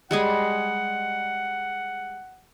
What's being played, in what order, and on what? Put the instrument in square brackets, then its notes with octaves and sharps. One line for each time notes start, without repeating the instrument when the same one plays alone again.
[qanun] G3 G#3 G#4 [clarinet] F#5